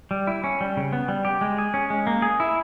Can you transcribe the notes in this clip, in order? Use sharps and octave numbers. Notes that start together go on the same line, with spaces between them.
G3
E4
C#4
G3
C#3
B3
G3
G4
G#3
G#4
C#4
G#3
A#3
G#4
E4